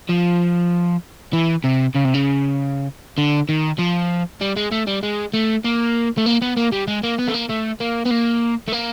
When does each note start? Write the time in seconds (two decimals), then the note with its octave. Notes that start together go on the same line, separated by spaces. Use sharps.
0.09 F3
1.33 E3
1.64 C3
1.95 C#3
2.04 C3
2.14 C#3
3.18 D3
3.49 D#3
3.79 F3
4.41 G3
4.57 G#3
4.72 A3
4.87 G3
5.03 G#3
5.33 A3
5.64 A#3
6.17 A3
6.26 A#3
6.42 B3
6.57 A#3
6.72 G3
6.88 G#3
7.03 A#3
7.18 B3
7.28 A3
7.34 A#3
7.49 A3
7.80 A#3
8.06 B3
8.11 A#3
8.68 A3
8.73 A#3